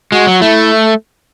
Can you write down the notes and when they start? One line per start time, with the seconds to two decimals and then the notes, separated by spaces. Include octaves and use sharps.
0.12 G#3 F#4
0.27 F#3
0.41 A3 E4